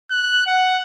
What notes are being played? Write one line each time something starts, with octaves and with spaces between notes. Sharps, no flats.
F#6
F#5